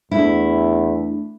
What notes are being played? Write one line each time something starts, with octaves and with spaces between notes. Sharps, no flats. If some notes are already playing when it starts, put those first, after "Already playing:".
E2 A3 D4 E4